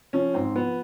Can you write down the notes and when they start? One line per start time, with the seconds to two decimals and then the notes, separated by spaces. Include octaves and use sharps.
0.13 F3 C#4
0.34 G#2 C4
0.55 F3 B3